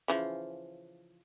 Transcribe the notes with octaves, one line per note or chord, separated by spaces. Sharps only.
C#3 E3 F3